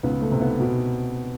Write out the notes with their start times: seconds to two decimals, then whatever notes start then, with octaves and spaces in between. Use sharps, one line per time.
0.03 C#2 B3
0.21 A3
0.31 C3
0.41 B3
0.60 B2